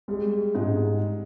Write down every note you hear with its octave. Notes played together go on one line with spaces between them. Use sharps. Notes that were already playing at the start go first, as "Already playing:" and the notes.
G3 G#3
G#2 G#3